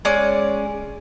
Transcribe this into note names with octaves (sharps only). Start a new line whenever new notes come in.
G#3 C#4 D5